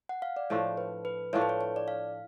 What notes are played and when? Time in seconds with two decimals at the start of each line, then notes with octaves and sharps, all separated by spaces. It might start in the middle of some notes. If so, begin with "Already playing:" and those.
0.09 F#5
0.22 F5
0.37 D5
0.50 A2 F3 A3 D4 C#5
0.77 B4
1.05 B4
1.33 A2 F3 A3 D4 C#5
1.42 B4
1.49 C#5
1.61 C#5
1.76 D5
1.88 F5